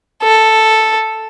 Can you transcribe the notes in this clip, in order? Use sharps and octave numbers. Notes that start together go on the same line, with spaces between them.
A4